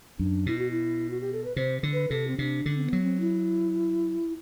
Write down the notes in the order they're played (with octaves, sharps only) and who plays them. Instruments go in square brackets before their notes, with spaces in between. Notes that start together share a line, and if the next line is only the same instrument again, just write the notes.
[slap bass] F#2 [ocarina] D4
[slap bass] B2 [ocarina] E4
[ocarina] F#4
E4
F#4
G4
A4
B4
[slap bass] C3 [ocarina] C5
[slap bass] D3
[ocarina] B4
[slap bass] C3 [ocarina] A4
[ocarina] C4
[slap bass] C3 [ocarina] D4
[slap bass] D3 [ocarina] D4
[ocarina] C4
B3
[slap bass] F#3
[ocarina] C4
E4